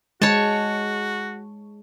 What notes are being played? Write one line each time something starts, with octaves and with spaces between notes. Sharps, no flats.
G#3 F#4 C#5 A5